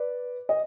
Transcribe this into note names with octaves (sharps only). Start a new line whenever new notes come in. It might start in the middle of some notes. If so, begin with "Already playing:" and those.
Already playing: B4 D5
D#5